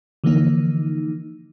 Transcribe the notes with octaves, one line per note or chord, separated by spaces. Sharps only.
D3 E3 F3 A#3 D#4